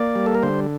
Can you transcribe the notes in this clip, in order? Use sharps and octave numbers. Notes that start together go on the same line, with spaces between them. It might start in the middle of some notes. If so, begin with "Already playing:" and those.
Already playing: A#3 D5
G3
A4
A#4
D3 C5